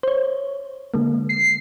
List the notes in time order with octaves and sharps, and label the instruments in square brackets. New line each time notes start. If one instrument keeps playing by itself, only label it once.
[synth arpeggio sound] C5 C#5
D3 G#3 A#3
[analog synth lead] C7